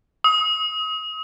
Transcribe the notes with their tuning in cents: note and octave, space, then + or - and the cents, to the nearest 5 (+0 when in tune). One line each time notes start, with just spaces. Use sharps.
D#6 +35